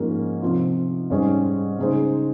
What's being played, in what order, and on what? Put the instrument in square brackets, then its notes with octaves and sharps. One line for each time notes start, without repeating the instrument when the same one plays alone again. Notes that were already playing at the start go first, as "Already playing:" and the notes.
Already playing: [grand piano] G#2 F3 A#3 C#4 G#4
C3 F3 C4 F4
G#2 G3 C#4 G#4 C5
C#3 G#3 D#4 G#4 C5